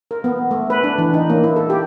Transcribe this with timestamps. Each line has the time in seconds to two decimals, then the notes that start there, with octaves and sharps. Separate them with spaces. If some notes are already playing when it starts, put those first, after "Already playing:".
0.11 A#4
0.24 B3
0.51 A3
0.70 B4
0.84 D4
0.98 E3
1.14 D#4
1.30 A#3
1.44 E4
1.56 A4
1.70 G4